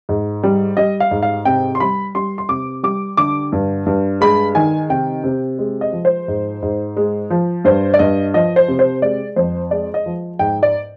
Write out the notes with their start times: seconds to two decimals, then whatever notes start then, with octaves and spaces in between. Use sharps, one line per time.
0.09 G#2
0.43 G3
0.77 G3 D#5
1.00 F5
1.11 G#2
1.23 F5
1.45 C3 G5
1.75 C6
1.80 G3 B5
2.15 G3 C6
2.38 C6
2.49 C3 D6
2.83 G3 D6
3.17 D3 D6
3.52 G2
3.86 G2
4.21 G#3 B5
4.55 D#3 G#5
4.90 C3 G5
5.24 C3
5.59 G#3
5.81 D#5
5.92 F3
6.05 C5
6.28 G#2
6.62 G#2
6.97 G#3
7.30 F3
7.65 G2 C5
7.94 D5
7.99 G2 D#5
8.34 F3 D#5
8.56 C5
8.68 C3
8.79 C5
9.02 G#3 D5
9.36 F2 C5
9.71 G#3 D5
9.94 D#5
10.06 F3
10.39 G#2 G5
10.63 D5